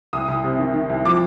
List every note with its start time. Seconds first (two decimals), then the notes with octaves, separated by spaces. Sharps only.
0.13 C2 D#6
0.28 C2
0.43 C3
0.59 D#3
0.74 D#3
0.89 C2
1.05 F3 D6